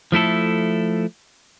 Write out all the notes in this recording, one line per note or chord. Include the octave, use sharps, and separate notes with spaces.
F3 A3 E4 A4